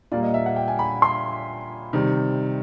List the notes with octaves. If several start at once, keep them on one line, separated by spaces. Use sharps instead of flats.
A#2 G3 A#3 D5
D#5
E5
F#5
G5
G#5
B5
C6
C3 D#3 G3